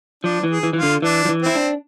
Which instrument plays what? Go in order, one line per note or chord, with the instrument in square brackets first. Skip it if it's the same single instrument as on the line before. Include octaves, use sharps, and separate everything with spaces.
[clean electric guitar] F3 [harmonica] D4
[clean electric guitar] E3
[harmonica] G#4
[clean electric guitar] E3
[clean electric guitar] E3 [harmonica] F4
[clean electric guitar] D3
[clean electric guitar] E3 [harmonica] D4
[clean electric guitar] F3
E3
[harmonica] C4 [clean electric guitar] E4
[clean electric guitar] D4